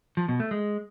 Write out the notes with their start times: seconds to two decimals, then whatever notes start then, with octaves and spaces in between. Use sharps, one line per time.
0.17 F3
0.28 B2
0.40 A3
0.51 G#3